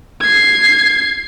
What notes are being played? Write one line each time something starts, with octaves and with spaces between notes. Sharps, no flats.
G#6 C7